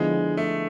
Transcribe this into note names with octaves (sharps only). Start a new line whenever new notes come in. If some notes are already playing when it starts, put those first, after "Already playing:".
Already playing: D3 F3 G#3 B3 E4 G#4
A3